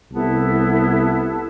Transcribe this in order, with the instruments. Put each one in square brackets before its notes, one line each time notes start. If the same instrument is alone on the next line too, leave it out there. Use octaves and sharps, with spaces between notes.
[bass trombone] C2 [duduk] B3 [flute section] E4 A4 A5